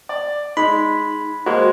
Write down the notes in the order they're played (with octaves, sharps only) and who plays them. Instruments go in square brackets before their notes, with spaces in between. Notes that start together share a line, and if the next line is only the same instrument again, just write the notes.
[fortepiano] D5
[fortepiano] G#3 [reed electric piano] D#4 [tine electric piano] B5
[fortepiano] G#3 A#3 [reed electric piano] F#4 C5